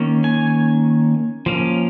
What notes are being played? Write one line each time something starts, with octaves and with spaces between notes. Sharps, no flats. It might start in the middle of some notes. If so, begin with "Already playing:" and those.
Already playing: D#3 A#3 C#4
G#5
F3 A#3 C#4